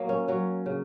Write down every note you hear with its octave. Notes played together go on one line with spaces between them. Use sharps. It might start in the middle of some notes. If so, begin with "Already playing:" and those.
Already playing: F#3 A#3
C#4
F#3 C#4
C#3